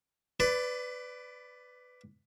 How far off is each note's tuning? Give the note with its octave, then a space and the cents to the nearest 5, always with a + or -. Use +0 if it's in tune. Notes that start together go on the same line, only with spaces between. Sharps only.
B4 +15 D5 +0 B5 +35